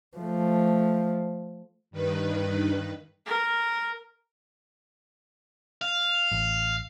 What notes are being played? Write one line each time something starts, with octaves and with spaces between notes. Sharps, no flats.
F3 A3
G2 D#3 B4
A#4
F5
A1